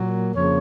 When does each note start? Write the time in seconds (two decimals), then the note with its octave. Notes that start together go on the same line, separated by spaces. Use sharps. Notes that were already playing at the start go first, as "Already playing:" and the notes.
Already playing: A#2 F#3 A#3
0.34 F2 C#3 F3 A#3 C#5